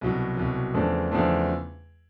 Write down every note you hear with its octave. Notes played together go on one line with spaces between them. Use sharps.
C2 B2 F#3
C2 B2 F#3
E2 C#3 F3 A3 D4
E2 C#3 F3 A3 D4